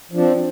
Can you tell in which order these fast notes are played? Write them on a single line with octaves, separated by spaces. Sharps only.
F3 D4 C4